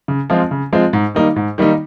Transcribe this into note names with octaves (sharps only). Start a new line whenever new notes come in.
C#3
F3 G#3 C4 F4
C#3
F3 G#3 C4 F4
G#2
D#3 G3 A#3 D#4
G#2
D#3 G3 A#3 D#4